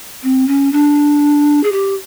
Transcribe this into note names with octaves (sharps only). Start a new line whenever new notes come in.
C4
C#4
D4
G#4
G4